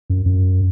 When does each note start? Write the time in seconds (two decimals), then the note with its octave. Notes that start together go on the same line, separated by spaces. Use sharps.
0.10 F#2
0.26 F#2